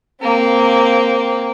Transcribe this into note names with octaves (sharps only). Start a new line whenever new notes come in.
A#3 C4